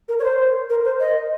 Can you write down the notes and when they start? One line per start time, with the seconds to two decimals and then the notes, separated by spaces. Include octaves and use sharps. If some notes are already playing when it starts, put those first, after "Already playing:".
0.08 A#4
0.19 C#5
0.24 C5
0.70 A#4
0.85 C5
1.00 D#5